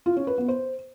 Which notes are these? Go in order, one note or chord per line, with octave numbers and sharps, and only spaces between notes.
F4
C#4
B4
B3
C5